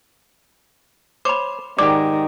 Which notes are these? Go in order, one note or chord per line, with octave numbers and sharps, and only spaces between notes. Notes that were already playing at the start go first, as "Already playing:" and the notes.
C5 C#5 B5 D6
G#2 D#3 G4 D5 D6